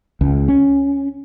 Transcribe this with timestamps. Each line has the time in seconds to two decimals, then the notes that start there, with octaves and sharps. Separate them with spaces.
0.21 C#2
0.48 C#4